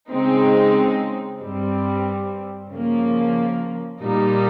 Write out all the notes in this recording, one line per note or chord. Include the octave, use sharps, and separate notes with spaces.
C#3 G#3 C4 D#4
G2 G3 C4
C#3 F3 A#3
A#2 G3 A#3 D#4